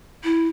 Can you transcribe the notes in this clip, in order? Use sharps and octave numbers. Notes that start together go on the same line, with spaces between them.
E4